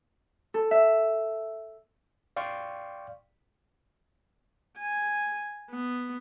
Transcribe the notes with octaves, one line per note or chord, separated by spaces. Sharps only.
A4
E5
D5 F5 G5 C6 C#6
G#5
B3